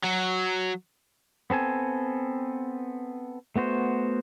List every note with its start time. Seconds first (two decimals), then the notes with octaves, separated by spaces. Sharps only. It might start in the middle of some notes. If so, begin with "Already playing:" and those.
0.04 F#3
1.50 B3 C4 A4 G#5
3.56 A3 B3 F#4 C5